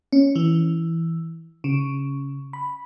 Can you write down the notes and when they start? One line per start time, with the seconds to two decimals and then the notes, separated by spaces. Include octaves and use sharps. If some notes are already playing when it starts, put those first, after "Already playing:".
0.13 C#4
0.36 E3
1.64 C#3
2.53 B5